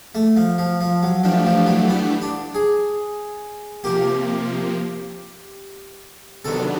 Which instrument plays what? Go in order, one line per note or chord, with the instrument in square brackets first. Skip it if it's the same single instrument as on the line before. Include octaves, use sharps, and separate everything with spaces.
[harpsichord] A3
F3
F3
F3
F#3
[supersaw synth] E3 A3 D4 G4 [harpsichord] F3
[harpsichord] F3
F#3
B3
D4
G#4
[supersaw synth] C3 F3 A#3 [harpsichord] G4
[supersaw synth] C3 D#3 F#3 B3 D4 [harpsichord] A4